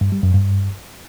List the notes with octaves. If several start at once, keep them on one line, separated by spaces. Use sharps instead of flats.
G2
G3
F#2
G2